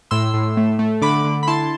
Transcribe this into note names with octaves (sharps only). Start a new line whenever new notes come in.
A2 C6 E6
A2
A3
A3
D3 B5 D6
D3
B5
E4 A5 C6